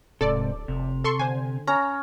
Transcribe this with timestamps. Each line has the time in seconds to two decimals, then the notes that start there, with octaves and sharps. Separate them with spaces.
0.21 D1 G#2 C3 A4 D5
0.68 F1 C3
1.04 A4 C6 C#6
1.19 D3 C5 G#5
1.67 C#4 A#5